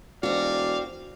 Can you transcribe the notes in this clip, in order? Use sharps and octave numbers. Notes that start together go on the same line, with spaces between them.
E1 C4 F#4 D5 F5